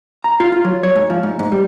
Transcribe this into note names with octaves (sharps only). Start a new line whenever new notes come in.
A#5
F4
F4
F#3
C#5
G#2
F3
G#2
G#2
G3